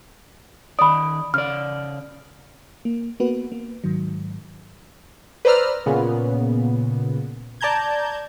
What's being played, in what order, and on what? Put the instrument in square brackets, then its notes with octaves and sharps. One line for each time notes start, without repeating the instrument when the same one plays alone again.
[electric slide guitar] D#3 D5 [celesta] B5 D#6
[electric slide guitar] C#3 D5 [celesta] F6
[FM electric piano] A#3
A#3 B3 F#4 B4
A#3
G#2 D#3 F#3
[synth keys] B4 C5 D5 A#5 E6 F6
A#2 C#3 B3
D5 A5 A#5 G6 G#6